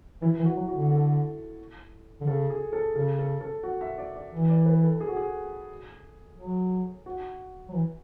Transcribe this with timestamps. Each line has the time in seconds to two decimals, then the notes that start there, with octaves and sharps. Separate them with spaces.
0.22 E3 E4
0.39 E3
0.45 F#4
0.56 F#3
0.68 F#4
0.73 D3
0.91 A4
2.21 D3
2.27 C#3 A4
2.50 G#4
2.73 A4
2.95 C#3 A4
3.19 A4
3.41 A4
3.63 F#4
3.81 E5
3.98 D5
4.16 D5
4.33 E3
4.49 D5
4.66 B4
4.84 A4
5.00 G#4
5.08 F#4
5.16 G#4
6.37 F#3
7.06 F#4
7.69 F#3
7.74 E3